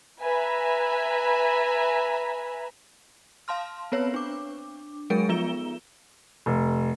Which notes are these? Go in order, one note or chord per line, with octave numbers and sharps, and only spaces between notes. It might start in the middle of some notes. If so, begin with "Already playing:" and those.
B4 E5 G#5 A#5 B5
F5 A5 C6 F6
B3 C4 B4 C#5
D4 D6
F#3 G#3 G#4 A#4 D7
F3 B3 F4 E7 G7
F1